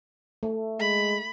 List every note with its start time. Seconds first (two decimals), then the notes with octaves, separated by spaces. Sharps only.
0.43 A3
0.80 G#3 B5